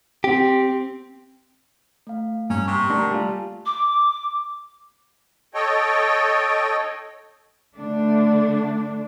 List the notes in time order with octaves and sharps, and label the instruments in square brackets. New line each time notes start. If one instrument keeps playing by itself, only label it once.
[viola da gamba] C4 [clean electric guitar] G4
[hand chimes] A3 F5
[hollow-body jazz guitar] G2 [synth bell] A#3 [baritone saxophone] C#4
[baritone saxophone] C3 [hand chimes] A#5 C#6
[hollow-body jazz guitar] A3 D4 A#4 [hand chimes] F#5 A5
[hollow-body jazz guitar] G3 A3 F4 [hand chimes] G#5
[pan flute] D6
[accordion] A4 C#5 D#5 G5
[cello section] D3 A3 D4